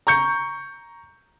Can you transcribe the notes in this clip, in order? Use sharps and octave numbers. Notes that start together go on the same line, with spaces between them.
A#5 C#6 G6 C#7